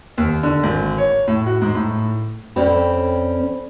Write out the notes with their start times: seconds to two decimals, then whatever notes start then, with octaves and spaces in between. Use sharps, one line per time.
0.18 D#2
0.43 D3
0.63 G#1
0.98 C#5
1.28 A2
1.46 F#4
1.62 G#2
1.75 A2
2.56 F2 C4 C#4 C5 D5 B5